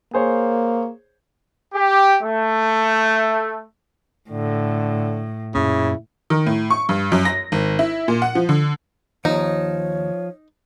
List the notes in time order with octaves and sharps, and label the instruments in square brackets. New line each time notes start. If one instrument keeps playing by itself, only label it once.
[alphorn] A#3 [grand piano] G#4 C5 C#5
[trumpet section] G4
A3
[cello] A2 [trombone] D3
[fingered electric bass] F#2 A#2 C#4 [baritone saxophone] C#3 [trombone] E4
[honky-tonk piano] D#3
A2
C#6
G2
F#2
A#6
G#1
E4
A#2
F#5
F3
D3
[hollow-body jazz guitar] D#2 [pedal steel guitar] F3 [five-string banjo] D#4 [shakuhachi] C#5